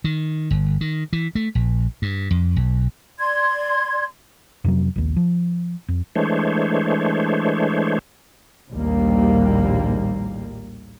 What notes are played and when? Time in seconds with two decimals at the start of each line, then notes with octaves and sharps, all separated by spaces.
0.04 D#3
0.51 G1
0.81 D#3
1.13 E3
1.35 A3
1.55 A#1
2.02 G2
2.31 F2
2.56 B1
3.19 D5 C6 G#6
4.65 F2 C3 F#3
4.96 A#1 D#2
5.16 F3
5.88 F2
6.16 E3 G#3 A3 D4 C5 C#5
8.70 A#1 D#2 A2 G3 A#3